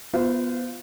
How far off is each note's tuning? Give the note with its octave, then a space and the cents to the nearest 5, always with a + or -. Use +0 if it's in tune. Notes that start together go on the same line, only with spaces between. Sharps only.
B3 -10 F4 +0 C5 -30